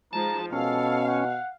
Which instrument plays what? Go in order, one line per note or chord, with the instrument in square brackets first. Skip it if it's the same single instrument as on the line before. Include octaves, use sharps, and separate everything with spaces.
[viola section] F3 G#3 D#4 [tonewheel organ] A5 [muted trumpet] A#5
[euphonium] B2 [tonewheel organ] C#4 [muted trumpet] A4 [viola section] F5
[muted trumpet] F#5